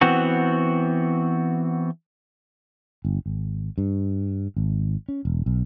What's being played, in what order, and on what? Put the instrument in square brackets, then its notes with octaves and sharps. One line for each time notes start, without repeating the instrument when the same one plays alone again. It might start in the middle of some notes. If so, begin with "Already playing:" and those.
[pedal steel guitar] E3 B3 C4 F#4
[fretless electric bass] G1
G#1
G2
G#1
C#4
E1
B1